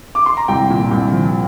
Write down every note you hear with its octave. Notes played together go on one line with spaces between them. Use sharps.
D6
C6
A#5
C2 G5
A#2
C2
F3